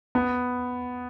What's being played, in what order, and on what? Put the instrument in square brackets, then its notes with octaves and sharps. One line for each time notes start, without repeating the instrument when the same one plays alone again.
[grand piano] B3